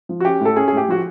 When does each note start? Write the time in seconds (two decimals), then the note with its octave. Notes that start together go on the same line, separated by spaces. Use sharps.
0.09 F3
0.20 F#4
0.25 C#4 G4
0.40 A2 A4
0.56 C#4 G#4
0.68 G#4
0.72 A2 G4
0.89 F3 F#4